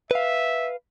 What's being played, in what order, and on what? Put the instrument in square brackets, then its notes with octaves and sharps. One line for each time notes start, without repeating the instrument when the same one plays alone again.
[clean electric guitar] B4 F5 [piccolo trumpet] E5